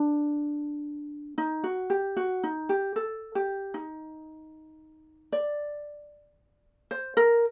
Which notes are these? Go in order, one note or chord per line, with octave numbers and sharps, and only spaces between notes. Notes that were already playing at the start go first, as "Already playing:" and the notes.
Already playing: D4
D#4
F#4
G4
F#4
D#4
G4
A4
G4
D#4
D5
C5
A#4